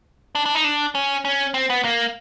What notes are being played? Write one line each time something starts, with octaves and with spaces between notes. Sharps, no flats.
D4
D4
D#4
D4
C#4
C#4
C4
B3
A#3